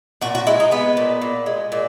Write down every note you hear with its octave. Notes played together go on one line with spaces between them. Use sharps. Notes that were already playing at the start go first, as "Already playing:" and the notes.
A#2 F#4
F#4
G#3 E4
D#4
G#3 B3
A#2
A#2
G#3
A#2